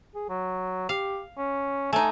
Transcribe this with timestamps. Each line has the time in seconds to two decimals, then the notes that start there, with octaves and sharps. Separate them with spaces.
0.15 G#4
0.29 F#3
0.89 G4 F5
1.38 C#4
1.93 A3 D#4 G#5